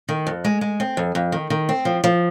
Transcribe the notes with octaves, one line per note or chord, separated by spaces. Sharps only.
D#3
F2
G#3
G#3
C4
F2
F2
D#3
D#3
C4
F3
F3